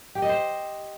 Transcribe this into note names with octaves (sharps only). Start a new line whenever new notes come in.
G4
D#5
C5